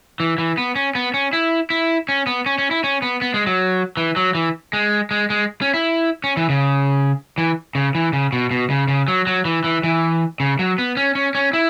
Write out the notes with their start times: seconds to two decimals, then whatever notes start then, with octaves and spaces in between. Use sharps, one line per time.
0.20 E3
0.38 E3
0.58 B3
0.76 C#4
0.95 B3
1.14 C#4
1.33 E4
1.70 E4
2.09 C#4
2.27 B3
2.46 C#4
2.58 C#4
2.71 E4
2.84 C#4
3.02 B3
3.21 B3
3.34 G#3
3.47 F#3
3.97 E3
4.16 F#3
4.35 E3
4.73 G#3
5.11 G#3
5.30 G#3
5.62 C#4
5.74 E4
6.24 C#4
6.37 E3
6.49 C#3
7.38 E3
7.75 C#3
7.95 E3
8.13 C#3
8.33 B2
8.51 B2
8.70 C#3
8.88 C#3
9.08 F#3
9.27 F#3
9.45 E3
9.64 E3
9.84 E3
10.40 C#3
10.59 F#3
10.78 B3
10.97 C#4
11.15 C#4
11.35 C#4
11.53 E4